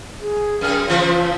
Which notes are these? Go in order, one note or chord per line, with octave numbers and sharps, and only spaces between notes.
G#4
F#2 G#4 F6
C#3 E3 F3 F4